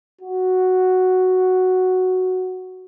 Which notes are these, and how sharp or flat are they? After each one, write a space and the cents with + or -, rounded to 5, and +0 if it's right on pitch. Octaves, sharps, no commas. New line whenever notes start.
F#4 +0